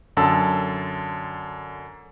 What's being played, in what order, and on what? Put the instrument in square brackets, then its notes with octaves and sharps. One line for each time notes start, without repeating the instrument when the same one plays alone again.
[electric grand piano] F#2 D3 A5 E6